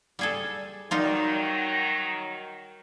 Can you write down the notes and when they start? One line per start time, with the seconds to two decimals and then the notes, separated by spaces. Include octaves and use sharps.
0.19 G3 G#4 A4
0.91 D#3 F#3 G3 D#4 F4